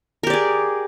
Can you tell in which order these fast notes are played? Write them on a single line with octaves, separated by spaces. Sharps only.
A#4 G4 D5 G#4